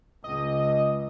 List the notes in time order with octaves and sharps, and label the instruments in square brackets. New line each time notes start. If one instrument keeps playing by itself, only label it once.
[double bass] C#2 [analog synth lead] D#5